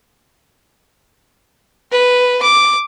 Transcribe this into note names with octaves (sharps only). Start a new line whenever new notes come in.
B4
D6